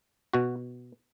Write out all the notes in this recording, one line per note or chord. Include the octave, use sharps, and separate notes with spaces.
B2 F#4